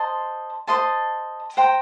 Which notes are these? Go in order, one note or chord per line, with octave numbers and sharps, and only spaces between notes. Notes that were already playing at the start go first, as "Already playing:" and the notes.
Already playing: C5 D#5 A5 C6
C5 D#5 A5 C6
C5 G5 A#5